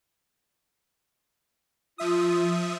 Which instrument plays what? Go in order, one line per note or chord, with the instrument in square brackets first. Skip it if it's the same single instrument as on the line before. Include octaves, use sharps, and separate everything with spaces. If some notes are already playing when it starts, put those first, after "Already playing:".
[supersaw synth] F3 E5 D#6 [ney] F4